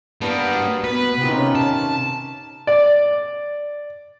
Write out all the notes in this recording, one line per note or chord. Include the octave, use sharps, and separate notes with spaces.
G3 B3 D4 A#4 F5
F#4
B3 B4
C3 D#3 C#4 F4 G4
A5
D5